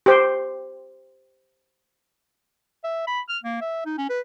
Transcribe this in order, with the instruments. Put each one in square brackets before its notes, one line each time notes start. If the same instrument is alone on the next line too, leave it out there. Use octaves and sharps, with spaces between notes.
[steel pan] G4 C5
[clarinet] E5
B5
F6
A#3
E5
D#4
C#4
B4